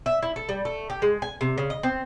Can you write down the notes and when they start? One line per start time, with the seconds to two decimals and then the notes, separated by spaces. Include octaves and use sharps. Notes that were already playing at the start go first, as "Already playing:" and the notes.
0.06 E5
0.23 E4
0.36 A4
0.49 G3
0.65 A3
0.90 G4
1.02 G#3
1.22 G#5
1.41 C3
1.58 C#3
1.70 D#5
1.83 C4